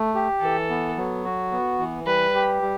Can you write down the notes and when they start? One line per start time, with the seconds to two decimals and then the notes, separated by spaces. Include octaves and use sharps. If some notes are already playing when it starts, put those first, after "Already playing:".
Already playing: A3
0.15 G4
0.42 E3 A4
0.70 B3
0.97 F#3
1.24 F#4
1.52 B3
1.79 E3
2.06 G3 B4
2.35 G4
2.62 G3